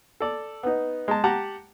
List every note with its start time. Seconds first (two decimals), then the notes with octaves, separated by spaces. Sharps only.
0.20 A4 D5
0.63 B3 D#4
1.08 G#3 A5
1.24 G4 F#5 A5 A#5